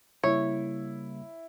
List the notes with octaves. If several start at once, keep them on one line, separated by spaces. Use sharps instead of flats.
C#3 G3 A#3 E4 C#5